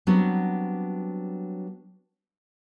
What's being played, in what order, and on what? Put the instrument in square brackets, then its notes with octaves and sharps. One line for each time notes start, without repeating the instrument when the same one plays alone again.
[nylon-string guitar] F#3 G3 B3 C4 D4 F#4